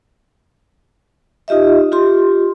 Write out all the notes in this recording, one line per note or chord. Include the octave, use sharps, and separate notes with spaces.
D#4 F4 G4 D#5 E5
F4 G4 C6